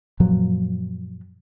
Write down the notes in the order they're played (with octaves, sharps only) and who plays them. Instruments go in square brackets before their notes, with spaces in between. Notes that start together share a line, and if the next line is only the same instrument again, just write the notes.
[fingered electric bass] F#2 A#2 F3 F#3